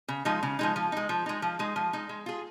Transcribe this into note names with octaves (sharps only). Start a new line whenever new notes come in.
C#3
F3 G#3 D#4
C#3
F3 G#3 D#4
F3
G#3 D#4
F3
G#3 D#4
F3
G#3 D#4
F3
G#3 D#4
G#3
F4 G#4